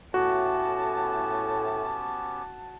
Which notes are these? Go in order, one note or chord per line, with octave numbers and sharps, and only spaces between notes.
A2 B3 C#4 F#4 G4 A5